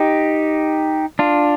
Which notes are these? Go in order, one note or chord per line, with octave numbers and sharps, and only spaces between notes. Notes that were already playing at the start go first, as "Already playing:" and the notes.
Already playing: D#4 G4
D4 F4